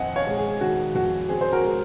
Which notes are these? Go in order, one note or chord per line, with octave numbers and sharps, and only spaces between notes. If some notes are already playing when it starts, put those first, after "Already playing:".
Already playing: F2 D#3 C4 D#5 F#5 G#5
C#5 F5
G#3
G#4
D#3 F#4
F2 F#4
C4 G#4
C5
F#4 A#4
G#3